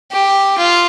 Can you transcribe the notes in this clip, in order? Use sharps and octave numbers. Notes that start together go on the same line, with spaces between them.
G4
F4